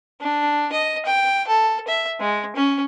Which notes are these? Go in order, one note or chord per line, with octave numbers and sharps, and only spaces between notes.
D4
D#5
G5
A4
E5
G#3
C#4